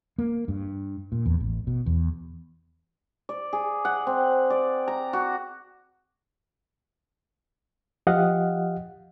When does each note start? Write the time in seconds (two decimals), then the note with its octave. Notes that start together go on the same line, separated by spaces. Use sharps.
0.18 A#3
0.48 G2
1.12 A#2
1.26 E2
1.40 A1
1.67 B2
1.86 E2
3.29 D5
3.53 G#4
3.85 F#5
4.07 C4
4.50 D5
4.88 A#5
5.13 F#4
8.07 F3 G4 D#5 F5 F#5